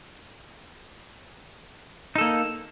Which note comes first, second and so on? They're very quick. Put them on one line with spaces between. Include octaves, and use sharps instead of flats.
D#4 A4 A#3